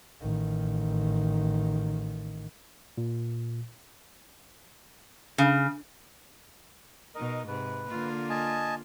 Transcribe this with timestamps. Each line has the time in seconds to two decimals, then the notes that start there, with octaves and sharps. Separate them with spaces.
0.22 A1 D#3
2.98 A#2
5.38 C#3
7.15 B2 D#4 A#4 D#5
7.48 G#2 C3 B4
7.88 D3 A#3 F4
8.30 D#5 G#5 A5